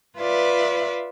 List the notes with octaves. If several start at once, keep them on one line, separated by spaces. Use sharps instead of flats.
F4 B4 D5 E5